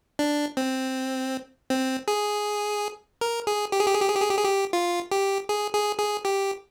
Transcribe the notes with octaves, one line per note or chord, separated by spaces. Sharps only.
D4
C4
C4
G#4
A#4
G#4
G4
G#4
G4
G#4
G4
G#4
G4
G#4
G4
G#4
G4
F4
G4
G#4
G#4
G#4
G4